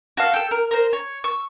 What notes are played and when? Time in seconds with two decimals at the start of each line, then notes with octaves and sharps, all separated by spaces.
0.17 F#4 A4 F5
0.34 G4 A4
0.51 A#4
0.71 A#4 C5
0.93 C#5
1.24 C#6 E6